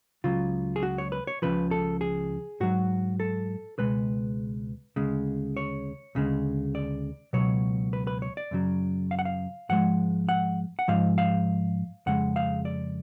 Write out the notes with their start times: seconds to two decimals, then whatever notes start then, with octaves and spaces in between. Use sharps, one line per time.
0.24 C#2 C#3 F#3 F4
0.76 G#4
0.83 F#4
0.98 C#5
1.12 B4
1.27 C#5
1.42 C#2 C#3 F3 B4
1.71 A4
2.01 G#4
2.60 G#2 F#3 F#4
3.20 A4
3.78 C#2 B2 G#3 B4
4.96 D2 C#3 G#3
5.57 C#5
6.15 D2 C#3 G#3
6.75 D5
7.33 C#2 B2 F#3 C#5
7.93 B4
8.07 B4
8.22 C#5
8.37 D5
8.51 F#2 C#3 F#3
9.11 F5
9.19 F#5
9.25 F5
9.69 G#2 F3 G#3 F#5
10.29 F#5
10.79 F#5
10.88 G#2 F3 G#3 F5
11.18 F5
12.06 F2 C#3 G#3 F#5
12.36 F5
12.65 D5